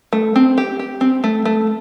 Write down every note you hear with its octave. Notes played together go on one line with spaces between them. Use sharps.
A3
C4
G4
G4
C4
A3
A3